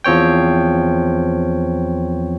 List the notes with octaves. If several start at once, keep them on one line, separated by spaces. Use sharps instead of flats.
E2 F3 C4 C#5 G5